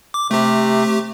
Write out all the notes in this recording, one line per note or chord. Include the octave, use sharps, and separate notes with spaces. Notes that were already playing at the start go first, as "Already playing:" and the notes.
D6
C3 A3 G4